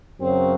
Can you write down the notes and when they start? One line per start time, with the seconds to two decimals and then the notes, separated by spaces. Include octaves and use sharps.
0.20 F#2 C#3 F#3 C4